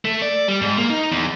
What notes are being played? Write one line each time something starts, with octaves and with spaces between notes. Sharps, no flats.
A3
D5
G3
G#2
A#3
D#4
E2